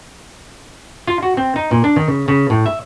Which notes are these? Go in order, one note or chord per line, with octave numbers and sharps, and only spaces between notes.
F4
F#4
C4
D#4
A#2
D4
D#3
C#3
C#3
A2
E5